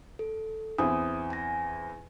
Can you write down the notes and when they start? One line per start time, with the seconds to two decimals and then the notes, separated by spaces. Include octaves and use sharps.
0.19 A4
0.78 E2 C4 E4 D#6
1.30 G#5 A#6